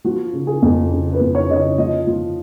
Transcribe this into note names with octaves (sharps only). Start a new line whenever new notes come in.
F3 F#4
C#3
G#4
F2
C#3
B4
F2
C#5
C#3 D#5
C#5
F3 D#5
F3